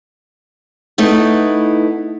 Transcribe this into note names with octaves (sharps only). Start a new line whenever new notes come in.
A3 B3 D#4 E4